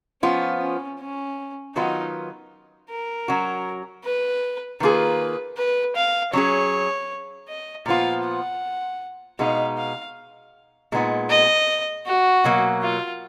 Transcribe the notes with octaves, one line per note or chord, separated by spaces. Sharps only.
F3 B3 C#4 F4
C#4
C#4
D#3 F#3 B3 D#4 F4
A#4
F#3 C#4 F#4
B4
D#3 A#3 F4 G#4 B4
B4
F5
F#3 C#4 G#4 C#5
D#5
A#2 F3 B3 F4 F5
F#5
B2 G#3 B3 D#4 F5
F5
A#2 G#3 B3 D#4
D#5
F#4
B2 F#3 A#3
F4